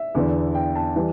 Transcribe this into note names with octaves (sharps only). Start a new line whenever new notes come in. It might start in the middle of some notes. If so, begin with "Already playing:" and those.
Already playing: E5
E2 D3 B3 E4
G5
A5
E3 G3